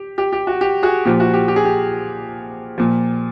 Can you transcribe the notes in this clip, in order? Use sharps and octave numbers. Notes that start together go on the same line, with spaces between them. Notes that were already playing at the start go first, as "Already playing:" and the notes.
Already playing: G4
G4
G4
F#4
G4
F#4 G#4
A#2 F3 G4
F#4
G4
G4
G#4
G4
A#2 F3